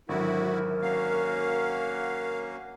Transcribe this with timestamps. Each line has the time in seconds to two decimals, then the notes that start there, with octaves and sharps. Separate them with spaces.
0.09 G#1 D3 F#3 E4 F#4 A#4
0.82 A#3 C#4 F#4 F5